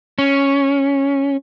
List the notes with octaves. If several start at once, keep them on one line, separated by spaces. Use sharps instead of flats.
C#4